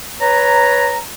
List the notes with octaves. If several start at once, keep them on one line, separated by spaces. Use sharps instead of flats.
B4 C#5 A#5